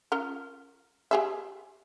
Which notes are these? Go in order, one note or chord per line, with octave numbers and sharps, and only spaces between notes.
C#4 F4 A#4
G4 G#4 E5